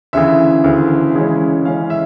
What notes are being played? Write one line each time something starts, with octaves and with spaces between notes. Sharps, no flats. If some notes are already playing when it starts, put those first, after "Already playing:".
D2 C#3 E3 E5
D2 C#3 E3
C#3 E3 G#3 C#4
C#3 E3 G#3 C#4 F5
E5